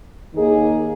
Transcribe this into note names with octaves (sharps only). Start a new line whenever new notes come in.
D#2 D#3 A#3 D#4 G#4